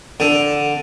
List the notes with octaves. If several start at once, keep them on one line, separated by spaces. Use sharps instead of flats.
D3